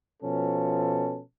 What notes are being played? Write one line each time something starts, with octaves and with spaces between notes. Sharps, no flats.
B2 F3 C#4 A4